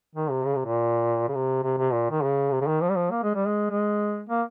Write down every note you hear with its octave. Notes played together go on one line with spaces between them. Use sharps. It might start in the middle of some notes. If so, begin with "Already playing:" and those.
D#3
C3
C#3
C3
A#2
C#3
C3
C3
C3
A#2
D#3
C#3
C3
C#3
D#3
F3
G3
F3
A#3
G#3
G3
G#3
G#3
A#3